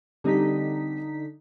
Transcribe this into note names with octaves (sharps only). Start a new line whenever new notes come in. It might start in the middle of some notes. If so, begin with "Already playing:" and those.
D3 G3 C4 D#4 G4 B6